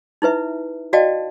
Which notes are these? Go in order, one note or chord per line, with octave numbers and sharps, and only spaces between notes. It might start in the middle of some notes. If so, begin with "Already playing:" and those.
D#4 E4 B4 E5
F#4 D5 D#5 F5 G5 A5